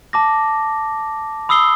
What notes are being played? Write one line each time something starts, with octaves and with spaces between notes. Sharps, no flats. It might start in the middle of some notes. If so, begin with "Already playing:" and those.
A5 D6 A#6
B5 D#6 E6 C7 G7